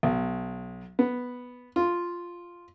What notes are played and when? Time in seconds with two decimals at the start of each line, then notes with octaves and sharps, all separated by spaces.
0.03 B1
0.99 B3
1.76 F4